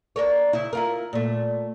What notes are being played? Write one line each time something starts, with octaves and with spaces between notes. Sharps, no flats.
D4 A#4 C#5
C#3 E4
E4 F4 A#4
A#2 A3